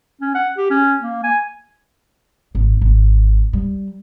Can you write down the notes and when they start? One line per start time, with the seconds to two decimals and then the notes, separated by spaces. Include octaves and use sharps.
0.21 C#4
0.35 F#5
0.57 G4
0.70 C#4
1.02 A#3
1.24 G#5
2.55 G#1
2.81 G#1
3.53 G3